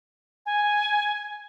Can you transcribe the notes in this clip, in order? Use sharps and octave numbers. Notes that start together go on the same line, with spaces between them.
G#5